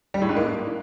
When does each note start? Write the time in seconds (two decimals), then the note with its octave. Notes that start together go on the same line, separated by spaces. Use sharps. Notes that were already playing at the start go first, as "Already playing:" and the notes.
0.14 G3
0.22 A2
0.29 G#2
0.37 A#3